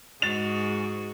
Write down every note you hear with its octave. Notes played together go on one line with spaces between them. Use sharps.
G#2 G#3 F#4 A6 F7